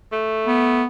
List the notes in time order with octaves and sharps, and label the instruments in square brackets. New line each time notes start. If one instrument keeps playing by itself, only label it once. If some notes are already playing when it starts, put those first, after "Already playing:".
[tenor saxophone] A3
[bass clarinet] B3